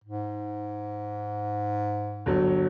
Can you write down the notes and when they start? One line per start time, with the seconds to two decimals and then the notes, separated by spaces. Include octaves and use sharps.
0.04 G#2
2.26 G1 F#3